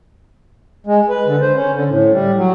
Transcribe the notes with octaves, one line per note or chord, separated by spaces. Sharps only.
G#3
B4
D3
C5
C#4
D3
A2
G3
F#3